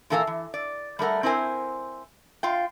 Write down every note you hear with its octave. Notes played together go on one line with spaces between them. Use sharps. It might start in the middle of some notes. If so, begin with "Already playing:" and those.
A#2 E3 A4 A#4 F5 G#5
E3
D5
G3 A3 A#4 F#5
C4 E4 A#4 C5 G#5
F4 F5 G5